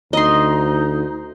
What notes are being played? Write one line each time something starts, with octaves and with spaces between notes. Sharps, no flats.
D2 D#4 D#5 A#5 C6